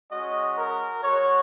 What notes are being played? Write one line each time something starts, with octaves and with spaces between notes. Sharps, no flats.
G#3 C#4 F#4 D#5
A#4
G#3 F#4 C#5